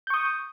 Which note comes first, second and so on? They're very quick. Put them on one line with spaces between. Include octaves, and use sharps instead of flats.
G6 C#6 D#6